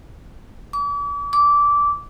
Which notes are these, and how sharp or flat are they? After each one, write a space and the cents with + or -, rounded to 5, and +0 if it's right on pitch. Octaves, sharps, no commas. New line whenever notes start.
D6 -40
D6 -15